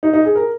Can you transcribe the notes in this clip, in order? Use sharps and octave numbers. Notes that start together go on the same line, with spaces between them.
D#4
D#4
G#4
A#4